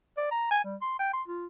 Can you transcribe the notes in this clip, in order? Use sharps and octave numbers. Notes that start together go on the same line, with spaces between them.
D5
A#5
G#5
G3
C6
G5
C6
F4